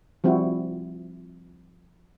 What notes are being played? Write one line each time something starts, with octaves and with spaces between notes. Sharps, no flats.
F3 G3 C4 E4 F#4